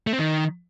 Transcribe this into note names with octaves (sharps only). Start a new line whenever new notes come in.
A3
C4
D#3